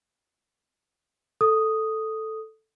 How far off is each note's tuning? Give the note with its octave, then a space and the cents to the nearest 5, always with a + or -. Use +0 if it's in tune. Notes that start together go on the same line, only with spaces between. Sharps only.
A4 +0 D#6 +0